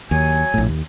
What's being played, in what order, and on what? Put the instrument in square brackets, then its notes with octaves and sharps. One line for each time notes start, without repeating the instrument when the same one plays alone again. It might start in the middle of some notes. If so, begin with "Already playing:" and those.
[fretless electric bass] D#2 [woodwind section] F#3 G#5
[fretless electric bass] A#1 A2
D#2